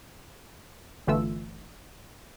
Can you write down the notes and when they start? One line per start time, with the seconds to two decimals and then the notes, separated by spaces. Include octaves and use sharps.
1.07 G1 D3 E3 A3 F4 E6